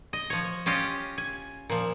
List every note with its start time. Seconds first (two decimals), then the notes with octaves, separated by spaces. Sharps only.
0.13 D#5
0.30 F3 C#5
0.66 C#4 F4 G4 D#5
1.18 G#5
1.70 A#2 F3